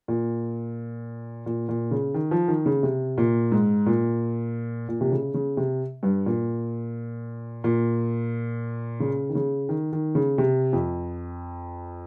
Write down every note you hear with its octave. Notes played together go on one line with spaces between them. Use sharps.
A#2
A#2
A#2
C#3
D#3
F3
D#3
C#3
C3
A#2
G#2
A#2
A#2
C3
C#3
C#3
C3
G2
A#2
A#2
C#3
D#3
C#3
D#3
D#3
C#3
C3
F2